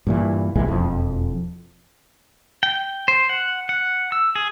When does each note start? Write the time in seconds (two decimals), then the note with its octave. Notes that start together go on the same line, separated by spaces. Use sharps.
0.07 G2 A#2 E3
0.56 C2 A#2 E3 G#3
0.68 E1 F2 F3
2.63 G5
3.08 C5
3.29 F#5
3.69 F#5
4.12 E6
4.35 G#4